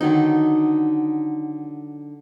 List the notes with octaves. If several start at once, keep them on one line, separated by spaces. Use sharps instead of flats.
D3 D#3 F#3 D#4